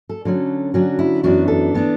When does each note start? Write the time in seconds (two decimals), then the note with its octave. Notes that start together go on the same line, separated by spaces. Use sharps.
0.09 A4
0.25 D3 F#3 C#4 A4
0.74 D3 F#3 C#4 F#4
0.99 E4
1.23 F#2 E3 B3 D4 F#4
1.48 A4
1.74 E3 B3 D4